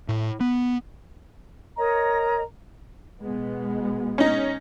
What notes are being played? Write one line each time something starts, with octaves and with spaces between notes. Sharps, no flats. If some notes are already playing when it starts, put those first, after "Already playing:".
A2
B3
A#4 C#5 D#5 A#5
B2 G#3 B3
C#4 D#4